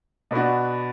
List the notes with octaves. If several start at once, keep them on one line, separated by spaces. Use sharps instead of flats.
B2 B3 D4 F#4